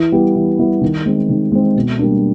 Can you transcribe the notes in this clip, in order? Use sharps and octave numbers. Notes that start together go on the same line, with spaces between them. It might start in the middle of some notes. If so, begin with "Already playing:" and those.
Already playing: E3
G3 B3 E4 G4
E3
G3 B3 E4 G4
D#3
G#3 C4
D#3
G#3 C4
B2
G3 A#3 D4